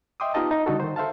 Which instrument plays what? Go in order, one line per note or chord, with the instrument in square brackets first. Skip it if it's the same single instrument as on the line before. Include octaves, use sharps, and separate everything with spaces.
[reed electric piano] D#5 E5 G5 C6 D6 D#6
B3 D#4 F4 G4 D#5 A5
D#4
D3 G3 D#4 F#4 A4
D#3 C5
A4 C5 E5 F5 A5